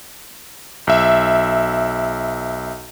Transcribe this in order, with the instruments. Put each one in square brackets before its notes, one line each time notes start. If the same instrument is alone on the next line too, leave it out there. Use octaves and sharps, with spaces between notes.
[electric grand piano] B1 E5